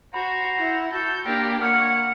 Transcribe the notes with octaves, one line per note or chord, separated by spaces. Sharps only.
F#4 C5 A#5 B5
E4 F#5
F#4 A4 G6
A#3 D4 F4 G4 A#4
A#3 C#5 F#5 F6 C#7